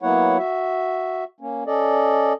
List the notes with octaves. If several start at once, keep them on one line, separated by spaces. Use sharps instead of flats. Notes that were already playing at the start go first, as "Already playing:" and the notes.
F#3 A#3 B3 E4 C#5 F#5
F#4 E5
A#3 C#4
C#4 A4 D5 D#5